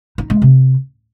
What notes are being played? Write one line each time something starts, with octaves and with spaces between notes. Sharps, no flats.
D#4
G#3
C3